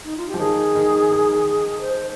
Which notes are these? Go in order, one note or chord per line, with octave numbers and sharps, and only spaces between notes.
D#4
F4
G4
F3
D#3 G#4
D#3
D#3
C5